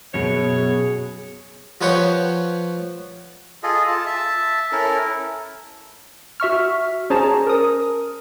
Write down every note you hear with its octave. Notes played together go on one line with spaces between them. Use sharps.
F#2 B2 G#4 C#5
G#4
F3 F4 B4 C#5 F#5 G5
F4 G#4 A4 D#5
F4 A5
E5 A5
C#4 E4 A4 A#4
F#4 E5 C#6 F6
C#4 G#4 C5 A5 A#5
A#4 D#6